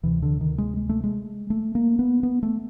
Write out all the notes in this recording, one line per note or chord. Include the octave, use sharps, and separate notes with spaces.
D2 C3 E3
D3
D#3
G#3
G#3
A3
G#3
A3
A#3
B3
B3
A3